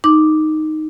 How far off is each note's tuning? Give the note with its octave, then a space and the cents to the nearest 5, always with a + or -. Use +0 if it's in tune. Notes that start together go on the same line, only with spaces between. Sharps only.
D#4 +0 D6 +0